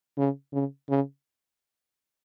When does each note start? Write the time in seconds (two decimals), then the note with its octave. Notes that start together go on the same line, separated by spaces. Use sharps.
0.17 C#3
0.53 C#3
0.89 C#3